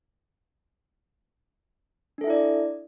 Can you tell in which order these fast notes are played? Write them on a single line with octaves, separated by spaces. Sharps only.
D4 A4 E5 E4 D5